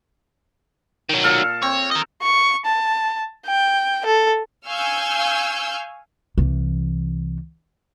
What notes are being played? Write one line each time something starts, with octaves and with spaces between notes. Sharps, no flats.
D#3 F#3
A#2 A4 F5
C4 C#5
A#4 D#5
C#6
A5
G5
A4
F5 G#5 C#6 E6 F6 G6
C2 E3